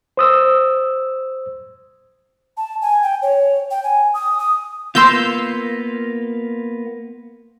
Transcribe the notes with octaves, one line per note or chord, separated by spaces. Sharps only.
C5 D#6 E6
A5
G#5
G5
C#5
G5
G#5
D#6
D#6
A#3 B3 F4 C6 E6 G6